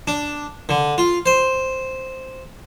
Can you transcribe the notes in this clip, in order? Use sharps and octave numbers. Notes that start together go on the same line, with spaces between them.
D4
D3
F4
C5